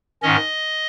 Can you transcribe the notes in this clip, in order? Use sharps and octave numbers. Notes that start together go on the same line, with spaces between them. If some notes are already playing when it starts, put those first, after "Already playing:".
G#2 D#3 C#4 D#5